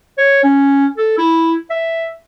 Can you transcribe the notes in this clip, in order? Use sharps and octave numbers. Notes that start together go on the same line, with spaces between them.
C#5
C#4
A4
E4
E5